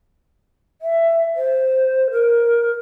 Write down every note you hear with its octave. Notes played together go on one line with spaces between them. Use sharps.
E5
C5
A#4